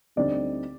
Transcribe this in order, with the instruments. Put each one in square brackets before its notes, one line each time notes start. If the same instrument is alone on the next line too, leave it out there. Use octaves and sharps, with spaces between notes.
[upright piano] D2 D3 G3 C4 D#4 [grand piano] D5